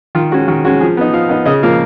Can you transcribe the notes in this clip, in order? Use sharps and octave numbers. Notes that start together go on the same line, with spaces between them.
D#3 F4
G#3 C#4 F#4
D#3 F#4
G#3 C#4 F#4
F3 G#4
B3 D#4
F3 F5
B3 D#4
C#3 D#5
F3 A#3 F5